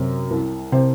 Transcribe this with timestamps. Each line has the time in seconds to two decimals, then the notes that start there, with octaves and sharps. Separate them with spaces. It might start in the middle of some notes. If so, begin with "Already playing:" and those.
Already playing: F#2 C3
0.31 C2
0.72 C3 C5